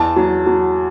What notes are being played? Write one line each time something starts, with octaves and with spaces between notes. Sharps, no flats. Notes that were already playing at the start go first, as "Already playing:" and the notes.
Already playing: E2 A5
F#3
F#3